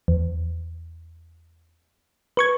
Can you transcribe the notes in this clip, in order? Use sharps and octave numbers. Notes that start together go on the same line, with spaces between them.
E2
B4 C#6 G#6